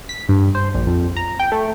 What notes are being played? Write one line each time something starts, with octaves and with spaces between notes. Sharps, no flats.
B6
G2
C5
A#1
F2
A#5
G5
A3